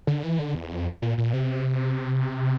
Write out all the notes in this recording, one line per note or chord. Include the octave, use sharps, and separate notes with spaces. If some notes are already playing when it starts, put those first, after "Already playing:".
D3
E3
D3
E2
F2
A#2
A#2
C3